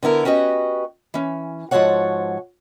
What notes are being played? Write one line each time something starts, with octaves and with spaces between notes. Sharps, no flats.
D3 B3 E4 A#4
C#4 F#4 G4 B4 D#5
E3 C#4
G#2 F3 F#4 A4 C#5 F#5